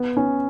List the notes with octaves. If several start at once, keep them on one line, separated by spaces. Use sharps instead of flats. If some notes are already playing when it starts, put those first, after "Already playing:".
Already playing: B3
C#4